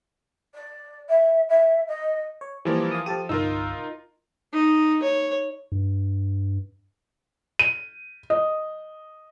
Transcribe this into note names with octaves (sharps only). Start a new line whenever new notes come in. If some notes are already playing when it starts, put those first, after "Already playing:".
D5
E5
E5
D#5
C#5
E3 F3 G3 A#3
F5 D#6
F3 G4 A4 A5 D#7
G1 C2 D#4 F4 A#4 E6
D#4
C#5
G2
D#7
D#5